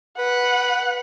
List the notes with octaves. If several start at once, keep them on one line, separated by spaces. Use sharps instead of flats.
B4 F#5